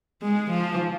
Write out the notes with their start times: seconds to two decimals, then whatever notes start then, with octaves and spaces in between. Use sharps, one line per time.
0.22 G#3
0.50 F3